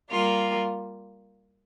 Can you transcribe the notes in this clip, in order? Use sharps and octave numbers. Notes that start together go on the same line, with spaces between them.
G3 A#3 F4